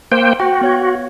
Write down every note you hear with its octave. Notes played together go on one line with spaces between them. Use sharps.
A#3 C5 G5
F#4 G5
B3 C#5 G#6